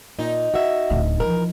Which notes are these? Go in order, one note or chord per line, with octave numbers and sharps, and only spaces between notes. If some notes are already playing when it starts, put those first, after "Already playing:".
A#2 D#4
F#4 E5
D1 D2
E3 F3 F4 A#4